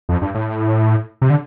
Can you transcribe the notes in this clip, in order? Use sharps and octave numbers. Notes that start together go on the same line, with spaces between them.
F2
G2
A2
C3
D3